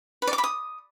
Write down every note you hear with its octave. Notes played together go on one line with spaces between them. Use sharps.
B4
D5
D6
B5
D#6